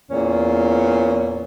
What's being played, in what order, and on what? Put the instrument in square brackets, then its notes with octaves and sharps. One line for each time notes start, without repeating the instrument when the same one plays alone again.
[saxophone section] E2 A#2 C#4